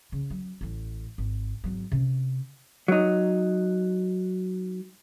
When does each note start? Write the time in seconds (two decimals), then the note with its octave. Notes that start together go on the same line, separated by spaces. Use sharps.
0.12 C#3
0.30 F#3
0.61 A1 A2
1.18 G#1
1.64 G#1 F#3
1.92 C3 C#4
2.88 F#3 D#4